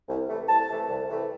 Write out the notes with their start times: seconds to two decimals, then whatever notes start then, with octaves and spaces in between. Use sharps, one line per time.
0.09 C2
0.29 C3 E3 A3
0.48 C2 A5
0.69 C3 E3 A3
0.89 C2
1.09 C3 E3 A3